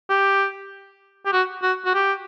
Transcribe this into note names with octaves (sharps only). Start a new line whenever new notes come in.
G4
G4
F#4
F#4
F#4
G4